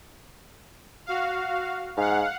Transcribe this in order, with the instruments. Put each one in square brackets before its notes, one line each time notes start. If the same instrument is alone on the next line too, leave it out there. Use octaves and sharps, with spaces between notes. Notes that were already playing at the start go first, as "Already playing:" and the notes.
[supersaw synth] F#4 F5
[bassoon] G#2 [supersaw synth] F5 F#5